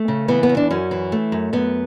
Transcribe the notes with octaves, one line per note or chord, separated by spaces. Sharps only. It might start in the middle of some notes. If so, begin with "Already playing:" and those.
Already playing: A3
C#3
E3 B3
B3
E2
D4
F#2 C#4
E3
A3
F#2
F#2 B3